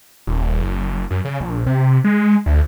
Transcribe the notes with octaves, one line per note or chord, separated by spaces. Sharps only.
D#1
F#1
F#2
C#3
A#1
C3
G#3
D2